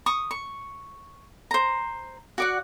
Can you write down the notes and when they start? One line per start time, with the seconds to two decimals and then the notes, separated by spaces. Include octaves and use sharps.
0.06 C#6 D#6
0.31 C#6
1.51 C5 A#5
2.38 F#4 D5 F#5